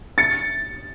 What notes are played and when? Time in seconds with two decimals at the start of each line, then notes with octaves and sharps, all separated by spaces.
0.18 A6 C#7